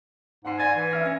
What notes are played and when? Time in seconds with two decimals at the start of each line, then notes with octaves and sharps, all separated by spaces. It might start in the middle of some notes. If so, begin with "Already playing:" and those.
0.45 G#2 F#5 C6 C7
0.58 D5 G#5 A6 A#6
0.75 E3 G#5
0.91 E5 F6 A#6
1.05 C#4 G#6 A#6